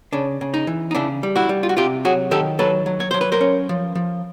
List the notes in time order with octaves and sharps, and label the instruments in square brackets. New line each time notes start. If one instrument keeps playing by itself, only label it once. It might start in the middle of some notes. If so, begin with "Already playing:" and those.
[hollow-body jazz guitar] C#3 D4
C#3
D#4
E3
D#4
C#3 D4 E4
G3
E4 F#4
G3
F4
F#4
C3 F4 G4
F#3 F#4 G#4
D#3 G4 A4
F#3 A4 B4
F#3
C#5
F#3 C5
B4
A#4 C5
C#4
F3
F3